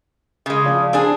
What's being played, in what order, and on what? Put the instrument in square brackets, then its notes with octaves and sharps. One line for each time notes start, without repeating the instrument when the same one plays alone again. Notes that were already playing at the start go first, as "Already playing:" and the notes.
[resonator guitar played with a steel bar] C#3 G#3
[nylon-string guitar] F3 F4 D5
[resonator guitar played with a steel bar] C4 D4 G#4